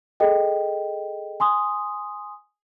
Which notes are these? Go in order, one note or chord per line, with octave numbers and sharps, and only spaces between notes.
G#4 A4 D#5 G5
G#5 C6 D#6